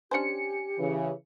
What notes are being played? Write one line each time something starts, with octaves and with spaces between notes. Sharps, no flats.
C#4 D4 G4 C5 G#5 C#7
C#3 E3